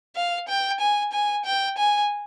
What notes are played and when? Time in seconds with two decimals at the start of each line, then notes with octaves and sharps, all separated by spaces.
0.16 F5
0.48 G5
0.80 G#5
1.13 G#5
1.45 G5
1.77 G#5